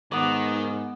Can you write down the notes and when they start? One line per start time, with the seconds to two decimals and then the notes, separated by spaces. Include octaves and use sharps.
0.12 G#2 D#3 B3 D6